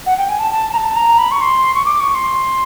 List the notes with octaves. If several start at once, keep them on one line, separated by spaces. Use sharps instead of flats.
F#5
G5
G#5
A5
A5
A#5
A5
A#5
B5
C#6
C6
C#6
D6
C#6
C6